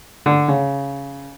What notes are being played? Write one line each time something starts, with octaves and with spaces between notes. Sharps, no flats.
D3
C#3